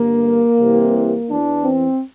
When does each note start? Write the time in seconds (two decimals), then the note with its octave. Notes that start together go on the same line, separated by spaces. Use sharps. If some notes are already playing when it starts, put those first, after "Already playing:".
Already playing: G1 G2 D3 A#3
0.58 C2 C3 E3
1.29 E2 E3 D4
1.63 C4